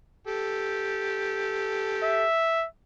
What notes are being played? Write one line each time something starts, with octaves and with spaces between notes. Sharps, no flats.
G4 A4
E5